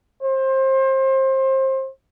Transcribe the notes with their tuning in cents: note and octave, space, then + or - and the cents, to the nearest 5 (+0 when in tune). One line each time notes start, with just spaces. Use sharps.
C5 +25